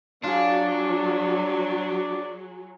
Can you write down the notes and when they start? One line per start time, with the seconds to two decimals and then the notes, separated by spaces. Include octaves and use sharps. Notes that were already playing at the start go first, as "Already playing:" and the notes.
0.24 F#3 D4 F4 G#4 D5